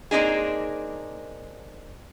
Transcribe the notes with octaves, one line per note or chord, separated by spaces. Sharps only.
A#3 C4 D4 D#4 G#4